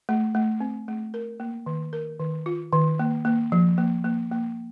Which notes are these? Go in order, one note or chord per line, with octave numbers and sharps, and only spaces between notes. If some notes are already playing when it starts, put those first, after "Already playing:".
A3
A3
C4
A3
A#4
A#3
D#3
A#4
D#3
F4
D#3
A#3
A#3
F3
A#3
A#3
A#3